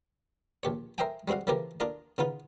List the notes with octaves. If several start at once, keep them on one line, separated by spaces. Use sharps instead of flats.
A#1 G4 C#5
A#4 C5 D#5 E5 G5 G#5
G3 G#3 C4 F#4 F5
C#3 E3 F3 A#3 G4 A#4
D4 F4 A#4 D#5
C#3 B3 D#4 F4